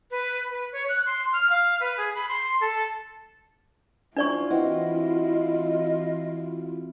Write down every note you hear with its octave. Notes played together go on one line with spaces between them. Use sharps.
B4
B4
C#5
F#6
C6
F6
F5
B4
G#4
B5
C6
A4
D4 E4 F4 C5 D5 C#6
E3 C4 F#4 D#5